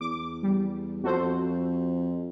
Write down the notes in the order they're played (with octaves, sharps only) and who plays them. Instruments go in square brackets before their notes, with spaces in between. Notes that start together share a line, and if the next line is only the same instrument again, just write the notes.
[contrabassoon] E2 [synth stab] D6
[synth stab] G3
[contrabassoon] F2 [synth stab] F#4 A4 C5